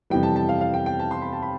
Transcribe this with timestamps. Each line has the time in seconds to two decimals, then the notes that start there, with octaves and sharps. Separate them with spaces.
0.10 F2 C3 E3 G3 G5
0.23 A5
0.36 A5
0.49 F5
0.61 F5
0.74 G5
0.86 G5
0.99 A5
1.11 C6
1.22 B5
1.33 A5
1.43 B5